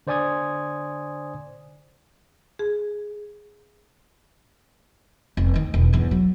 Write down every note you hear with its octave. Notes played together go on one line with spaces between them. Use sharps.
D3 C5 D5 G#5 D#6 G#6
G#4
F1
D2 D#3
E1
E2 G2
F#3